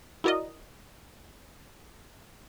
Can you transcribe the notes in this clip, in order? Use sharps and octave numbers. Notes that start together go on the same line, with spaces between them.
E4 F#4 A#4 D5 D#5